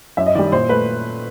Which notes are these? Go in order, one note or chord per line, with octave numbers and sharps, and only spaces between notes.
F#2 E5
D#5
D#3 G3 D5
A#2 C5
A3 B4